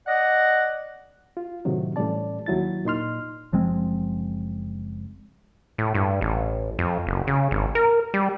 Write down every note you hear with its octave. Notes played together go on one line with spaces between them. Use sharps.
D5 D#5 F#5
F4
A2 C3 D#3 F#3
A2 E3 G3 C#4 D5 A5
D#2 F#3 E4 A6
A#2 D#4 C6 F6
F#1 F3 G#3 C4
A2
G2
A1
F2
F#1
C#3
G#1
A#4
G3